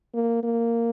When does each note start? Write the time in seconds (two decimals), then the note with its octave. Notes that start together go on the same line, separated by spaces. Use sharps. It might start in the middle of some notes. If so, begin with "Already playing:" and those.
0.14 A#3
0.43 A#3